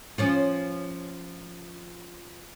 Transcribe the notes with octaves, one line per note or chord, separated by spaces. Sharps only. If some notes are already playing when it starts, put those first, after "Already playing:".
F3 C#4 F4